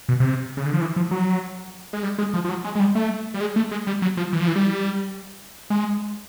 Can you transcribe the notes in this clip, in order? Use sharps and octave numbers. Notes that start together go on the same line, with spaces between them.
B2
C3
C#3
D3
F3
E3
F3
F#3
G#3
G3
G#3
F3
F3
F#3
G#3
G#3
G3
A3
G3
G#3
A3
G#3
G3
F#3
F3
E3
F3
E3
G3
G#3